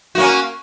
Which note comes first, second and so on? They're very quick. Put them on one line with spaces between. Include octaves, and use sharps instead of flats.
F#4 A#3 C#4